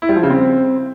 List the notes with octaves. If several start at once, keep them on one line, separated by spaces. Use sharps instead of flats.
E4
G3
F3
C#3
C4